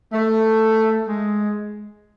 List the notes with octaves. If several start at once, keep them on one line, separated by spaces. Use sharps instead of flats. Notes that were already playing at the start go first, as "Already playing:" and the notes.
A3
G#3